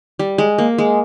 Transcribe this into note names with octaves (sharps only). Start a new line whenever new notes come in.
G3
G#3
A#3
G#3